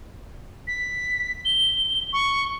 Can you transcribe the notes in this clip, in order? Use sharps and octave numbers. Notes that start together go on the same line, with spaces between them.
B6
G7
C#6